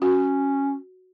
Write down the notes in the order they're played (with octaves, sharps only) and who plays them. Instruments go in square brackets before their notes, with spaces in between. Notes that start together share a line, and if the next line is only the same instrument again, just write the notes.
[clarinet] C#4 [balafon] F#4